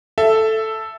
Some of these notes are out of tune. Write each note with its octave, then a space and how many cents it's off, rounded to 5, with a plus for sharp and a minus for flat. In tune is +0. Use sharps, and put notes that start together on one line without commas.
A4 +0 E5 +15